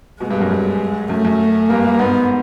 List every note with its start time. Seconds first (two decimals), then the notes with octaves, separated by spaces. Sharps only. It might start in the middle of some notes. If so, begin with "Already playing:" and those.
0.20 B2 G#3
0.30 G2
0.40 F#2
0.51 F#2
1.09 F#2 A3
1.25 F#2
1.69 G2 A#3
1.85 G2
1.99 G#2 B3
2.09 G#2